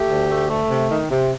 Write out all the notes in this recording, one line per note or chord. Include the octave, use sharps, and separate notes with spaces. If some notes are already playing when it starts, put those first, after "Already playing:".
Already playing: A3 G4
D2
A3
A3
C3
D#3
C3